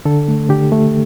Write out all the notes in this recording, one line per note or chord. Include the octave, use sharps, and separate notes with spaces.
D3 A4
A3
D3 G4
A3